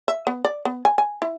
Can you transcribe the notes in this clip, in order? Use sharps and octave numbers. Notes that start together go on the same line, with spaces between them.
E5
B3
D5
B3
G#5
G#5
E4